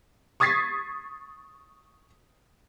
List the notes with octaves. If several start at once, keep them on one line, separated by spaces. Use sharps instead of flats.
C#6 D#6 G#6 A6 B6 C7